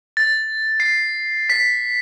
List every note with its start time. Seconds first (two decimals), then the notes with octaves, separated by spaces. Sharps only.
0.17 A6
0.80 C7
1.50 B6